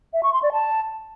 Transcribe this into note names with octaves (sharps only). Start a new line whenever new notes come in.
E5
C#6
C6
D5
A5